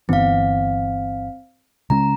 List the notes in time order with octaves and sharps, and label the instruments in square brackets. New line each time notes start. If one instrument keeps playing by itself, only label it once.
[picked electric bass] G1 E3 B3 [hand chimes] C4 F5
[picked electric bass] C#3 G#3 C#4 [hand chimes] A#5